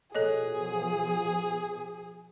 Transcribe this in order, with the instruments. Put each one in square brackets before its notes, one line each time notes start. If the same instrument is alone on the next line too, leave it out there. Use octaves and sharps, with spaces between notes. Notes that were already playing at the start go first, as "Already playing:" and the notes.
[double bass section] B2 F3 [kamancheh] G#4 [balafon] A4 C#5 D#5